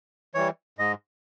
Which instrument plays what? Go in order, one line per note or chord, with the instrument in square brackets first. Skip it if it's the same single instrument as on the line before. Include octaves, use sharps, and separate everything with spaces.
[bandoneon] E3 G3 C#5
G#2 D#5